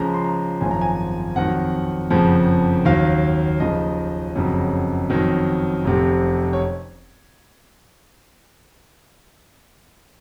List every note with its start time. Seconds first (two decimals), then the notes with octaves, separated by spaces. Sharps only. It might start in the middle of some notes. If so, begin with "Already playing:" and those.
Already playing: C#2 C#3 F3 A#5
0.14 C6
0.24 A#5
0.61 G#1 F#2 F3 G#5
0.71 A#5
0.81 G#5
1.36 F2 D#3 F#3 F#5
2.10 F#1 F2 C#3 F3
2.85 D#2 D#3 F#3 F5
3.60 D#2 C#3 F3 D#5
4.35 F#1 F2 C#3 F#3
5.10 F2 D#3 F#3
5.85 F1 F2 C3
6.53 C#5